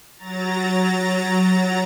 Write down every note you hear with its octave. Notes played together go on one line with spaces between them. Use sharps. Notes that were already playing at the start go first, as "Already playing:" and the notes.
F#3 A#5 A6